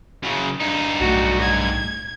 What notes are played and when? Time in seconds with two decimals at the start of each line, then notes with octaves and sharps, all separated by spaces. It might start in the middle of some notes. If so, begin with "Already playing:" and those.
0.23 F#2 C#3
0.60 G2 D#4
1.00 B1 A2 A3 F#4
1.42 G#6